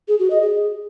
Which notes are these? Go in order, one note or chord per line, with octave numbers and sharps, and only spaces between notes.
G#4
F#4
D#5
G#4